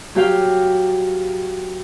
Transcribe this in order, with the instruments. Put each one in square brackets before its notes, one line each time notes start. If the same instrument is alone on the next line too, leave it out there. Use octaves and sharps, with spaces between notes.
[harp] F#3 G4 F5 G5